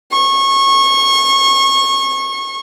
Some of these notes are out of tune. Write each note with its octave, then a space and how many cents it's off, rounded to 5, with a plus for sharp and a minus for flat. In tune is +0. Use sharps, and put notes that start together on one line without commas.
C#6 -25